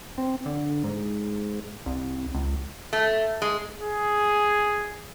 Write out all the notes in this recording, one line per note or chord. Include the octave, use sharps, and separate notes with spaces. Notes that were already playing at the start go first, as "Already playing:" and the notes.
C4
D3
G#2
C2
C#2
A3
G#3
G#4